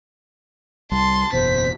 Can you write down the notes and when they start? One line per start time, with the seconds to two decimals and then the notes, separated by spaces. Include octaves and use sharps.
0.92 C2 G3 A5 C6
1.33 F#1 E2 B2 C5 B6